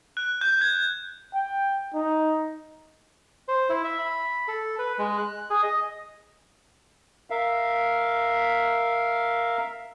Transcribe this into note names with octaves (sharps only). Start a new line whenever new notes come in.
F#6
G6
G#6
G5
D#4
C5
E4
E5
B5
A4
B4
G#3
F#6
G#4
D#5
A#4 E5 F5